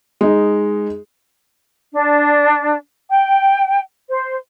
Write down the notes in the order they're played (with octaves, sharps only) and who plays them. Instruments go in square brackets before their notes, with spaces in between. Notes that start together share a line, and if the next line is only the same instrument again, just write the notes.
[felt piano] G#3 D#4
[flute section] D4
G5
C5